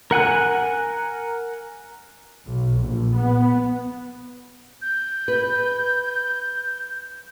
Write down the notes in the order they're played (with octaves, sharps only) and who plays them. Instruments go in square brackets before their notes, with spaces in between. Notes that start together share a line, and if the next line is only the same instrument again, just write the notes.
[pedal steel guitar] A#4 F#5 G#5 F#6
[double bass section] B1
A#1
B3
[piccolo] G6
[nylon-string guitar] B4